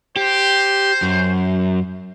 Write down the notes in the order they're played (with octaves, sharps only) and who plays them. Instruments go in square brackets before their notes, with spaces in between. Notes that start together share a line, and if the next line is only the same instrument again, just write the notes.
[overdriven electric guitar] G4 [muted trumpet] C5
[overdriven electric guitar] F#2